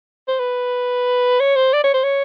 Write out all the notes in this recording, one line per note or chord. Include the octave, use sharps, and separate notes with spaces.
C5
B4
C#5
C5
D5
C#5
C5
C#5